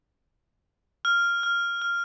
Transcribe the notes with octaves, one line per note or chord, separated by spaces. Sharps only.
F6
F6
F6